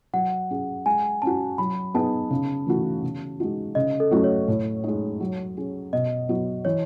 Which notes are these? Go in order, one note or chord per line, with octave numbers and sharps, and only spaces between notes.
F#3 F#5
C#4 G#4
G#3 G#5
C#4 F#4 A5
F#3 B5
B3 D#4 G#4 A5
C#3
E3 A3 D#4 F#4
C#3
G#3 D#4 F#4
C#3 D#5
A4
F#3 A3 C#4 F#4
C#5
A2
G#3 D#4
F#3
C#4 G#4
B2 D#5
F#3 B3 F#4
E3 C#5